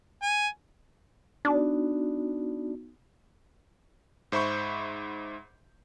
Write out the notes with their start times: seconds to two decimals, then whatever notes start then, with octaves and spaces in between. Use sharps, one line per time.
0.22 G#5
1.45 B3 D4 D#4 F#4
4.32 G#2 C5 E5 B5 C#6 G6